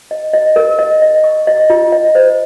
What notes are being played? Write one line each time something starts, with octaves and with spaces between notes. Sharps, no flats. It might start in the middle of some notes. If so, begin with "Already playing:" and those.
D#5
D#5
A#4
D#5
D#5
C#6
D#5
F4
D#5
C5